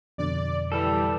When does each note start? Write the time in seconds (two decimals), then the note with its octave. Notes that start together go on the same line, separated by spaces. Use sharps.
0.18 F2 B2 D3 D5
0.72 E3 G3 A4